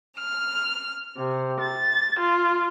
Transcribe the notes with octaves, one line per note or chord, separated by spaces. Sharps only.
F6
C3
A6
F4